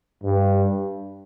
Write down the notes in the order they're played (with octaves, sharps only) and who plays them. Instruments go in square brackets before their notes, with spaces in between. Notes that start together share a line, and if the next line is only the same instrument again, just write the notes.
[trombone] G2